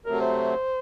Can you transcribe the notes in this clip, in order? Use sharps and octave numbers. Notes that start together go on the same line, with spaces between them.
C3 F#3 A3 A#4
C5